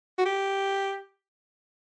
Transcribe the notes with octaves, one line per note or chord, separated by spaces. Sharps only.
F#4
G4